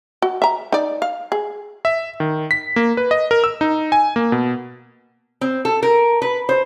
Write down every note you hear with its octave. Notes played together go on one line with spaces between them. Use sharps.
F#4
E5 A#5
D#4 D5
F5
G#4
E5
D#3
B6
A#3
B4
D#5
A#4
E6
D#4
G#5
A#3
B2
C4
A4
A#4
B4
C5